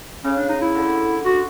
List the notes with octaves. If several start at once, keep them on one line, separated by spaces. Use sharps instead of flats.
C#3 C#4
D4
D#4
E4
D3
F#4